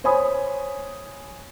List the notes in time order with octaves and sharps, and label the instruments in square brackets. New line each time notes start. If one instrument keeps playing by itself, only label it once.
[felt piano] C5 C#5 G#5 B5 D#6